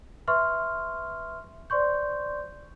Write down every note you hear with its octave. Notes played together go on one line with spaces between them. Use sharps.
B4 E5 C6 C#6 F6
C5 D5 C6 C#6 G6